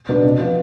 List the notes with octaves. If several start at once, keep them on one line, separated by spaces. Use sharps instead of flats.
B2 B3 D4
C3
F3 B3 F4